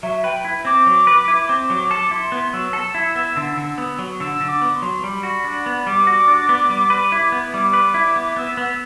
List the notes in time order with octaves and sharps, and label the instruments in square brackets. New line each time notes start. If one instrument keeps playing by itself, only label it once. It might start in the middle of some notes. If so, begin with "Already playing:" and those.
[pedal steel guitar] F#3 [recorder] E5
[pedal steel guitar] B4 [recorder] G5
[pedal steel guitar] E4
[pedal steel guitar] C4 [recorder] D6
[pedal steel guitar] F#3
B4
E4
C4
[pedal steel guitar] F#3 [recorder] D6
[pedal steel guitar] A4
[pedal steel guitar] E4 [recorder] C6
[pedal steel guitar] B3
[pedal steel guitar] F#3 [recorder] E6
[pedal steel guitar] A4
E4
B3
D3
D3
B3
F#3
[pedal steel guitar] D3 [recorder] E6
[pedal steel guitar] D3
[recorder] D6
[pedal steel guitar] B3
[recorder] C6
[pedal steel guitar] F#3
[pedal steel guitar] G3 [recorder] B5
[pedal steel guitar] F#4
D4
B3
[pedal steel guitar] G3 [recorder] D6
[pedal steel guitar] F#4
D4
B3
G3
B4
E4
B3
[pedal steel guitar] G3 [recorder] D6
[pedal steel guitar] B4
E4
B3
[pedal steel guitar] B3 [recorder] E6
[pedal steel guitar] B3